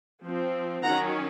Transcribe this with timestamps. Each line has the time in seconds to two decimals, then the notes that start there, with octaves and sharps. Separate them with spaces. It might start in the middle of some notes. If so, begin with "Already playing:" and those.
0.24 F3 C4
0.83 D#3 F#3 C#4 F#5 A#5